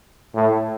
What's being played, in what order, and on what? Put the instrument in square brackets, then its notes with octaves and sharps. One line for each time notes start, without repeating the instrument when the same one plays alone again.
[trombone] A2